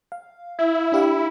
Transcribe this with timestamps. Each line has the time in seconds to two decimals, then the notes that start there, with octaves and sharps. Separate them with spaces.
0.12 F5
0.59 E4
0.92 D4 G4 F5